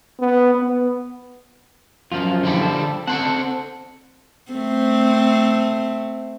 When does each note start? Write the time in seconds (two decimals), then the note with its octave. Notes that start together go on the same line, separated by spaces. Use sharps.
0.19 B3
0.54 B3
2.12 F#2 F3 F4
2.43 F#2 D3 E3 F3 G3
2.61 A4 A5
3.07 C4 A4 C5 F#5 A5
4.52 A3 C4